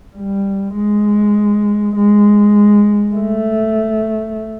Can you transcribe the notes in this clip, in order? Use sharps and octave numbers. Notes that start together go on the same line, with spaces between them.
G3
G#3
G#3
A3